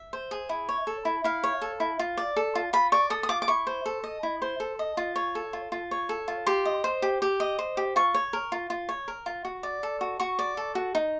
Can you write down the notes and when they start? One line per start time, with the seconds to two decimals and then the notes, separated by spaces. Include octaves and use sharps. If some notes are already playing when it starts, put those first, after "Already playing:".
Already playing: E5
0.13 C5
0.31 G#4
0.49 E4
0.69 C#5
0.87 A4
1.05 E4
1.24 E4 F5
1.43 C#5
1.62 A4
1.80 E4
1.99 F4
2.17 D5
2.36 A4
2.55 F4
2.73 F4 B5
2.92 D5 C#6
3.10 A4 D#6
3.23 D#6
3.29 F4 D6
3.42 D6
3.48 E4 C#6
3.67 C5
3.86 A4
4.04 D#5
4.23 E4
4.42 C5
4.60 A4
4.79 D#5
4.97 F4
5.16 C#5
5.35 A4
5.53 F4
5.72 F4
5.91 C#5
6.09 A4
6.28 F4
6.46 G4 C6
6.65 D#5
6.84 C5
7.02 G4
7.22 G4
7.40 D#5
7.59 C5
7.77 G4
7.96 F4 C#6
8.14 C#5
8.33 A#4
8.52 F4
8.70 F4
8.89 C#5
9.08 A#4
9.26 F4
9.45 F#4
9.63 D5
9.83 A4
10.01 F#4
10.20 F#4 C#6
10.39 D5
10.57 A4
10.75 F#4
10.95 D#4